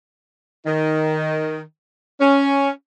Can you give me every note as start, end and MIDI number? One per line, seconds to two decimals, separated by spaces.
0.66 1.60 51
2.21 2.70 61